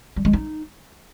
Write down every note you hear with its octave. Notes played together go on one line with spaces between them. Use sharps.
G3
G#3
D#4